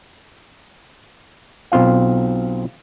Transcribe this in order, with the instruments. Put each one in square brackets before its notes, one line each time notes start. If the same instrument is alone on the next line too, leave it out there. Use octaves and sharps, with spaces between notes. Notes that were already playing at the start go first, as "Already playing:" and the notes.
[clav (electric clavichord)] B1 C4 F4 F5